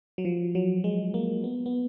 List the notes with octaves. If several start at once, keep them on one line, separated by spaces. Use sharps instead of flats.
F#3
F3
F#3
G#3
A#3
B3
B3